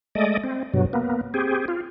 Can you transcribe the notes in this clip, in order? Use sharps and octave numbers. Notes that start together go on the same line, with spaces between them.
G#3 A3 D5 D#5
C4
G2 B2 F#3
A#3 B3
C4 G4 G#4
F4